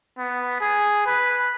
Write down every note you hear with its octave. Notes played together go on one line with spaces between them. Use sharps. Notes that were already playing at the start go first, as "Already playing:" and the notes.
B3
G#4
B4